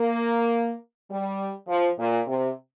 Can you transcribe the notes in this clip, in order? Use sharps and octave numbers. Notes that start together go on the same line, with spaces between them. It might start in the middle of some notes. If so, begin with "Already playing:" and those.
Already playing: A#3
G3
F3
A#2
C3